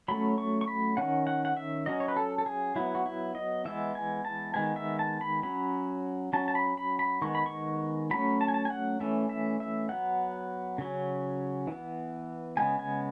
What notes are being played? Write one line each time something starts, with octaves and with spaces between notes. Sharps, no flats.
F#3 A3 C#4 B5
C#6
C#6
B5
D#3 A3 C#4 F#5
F#5
F#5
E5
F#3 C#4 D#5
C#5
B4
A4
A4
G#4
F#3 B3 E4
F#4
E4
D#5
E3 G#3 B3 E5
G#5
A5
D#3 G#3 B3 G#5
E5
A5
B5
F#3 C#4 B5
F#3 C#4 A5
A5
B5
B5
B5
D#3 G#3 B3 C#6
B5
C#6
F#3 A3 C#4 B5
A5
G#5
A5
G#5
F#5
E3 A3 C#4 E5
E5
E5
F#3 B3 F#5
C#3 F#3 C#4
E3 B3
C#3 G#3 B3 G#5
G#5